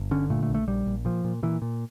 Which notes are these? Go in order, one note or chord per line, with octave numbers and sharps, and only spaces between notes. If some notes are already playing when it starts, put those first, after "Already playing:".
Already playing: G1
D3 C#4
A#2 A3
A3
A#1
A3
A#1 G3
A#1
A#2 F3
A#2
A#2 E3
A#2